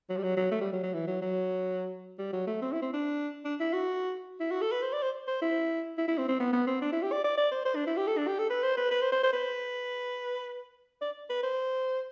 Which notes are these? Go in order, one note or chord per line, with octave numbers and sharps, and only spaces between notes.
F#3
G3
F#3
F#3
A3
G3
F#3
F#3
E3
F#3
F#3
G3
F#3
A3
C4
E4
C4
D4
D4
E4
F#4
E4
F#4
A4
B4
C5
D5
C5
C5
E4
E4
E4
C4
C4
B3
B3
C4
D4
E4
G4
D5
D5
D5
C5
C5
D4
E4
G4
A4
D4
G4
A4
B4
C5
B4
B4
C5
C5
C5
B4
D5
B4
C5